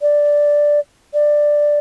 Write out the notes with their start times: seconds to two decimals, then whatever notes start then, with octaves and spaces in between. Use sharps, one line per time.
0.02 D5
1.14 D5